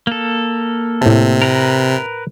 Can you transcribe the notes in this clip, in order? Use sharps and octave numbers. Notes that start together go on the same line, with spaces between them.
A#3 A4
A2 C3 A5
A#4 B4 A#5